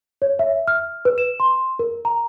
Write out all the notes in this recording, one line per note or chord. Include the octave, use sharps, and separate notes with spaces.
C#5
E5
F6
B4
E7
C6
A#4
A#5